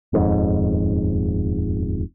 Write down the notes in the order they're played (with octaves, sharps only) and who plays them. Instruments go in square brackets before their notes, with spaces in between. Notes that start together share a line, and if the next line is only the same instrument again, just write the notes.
[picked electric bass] D#1 F2 G#2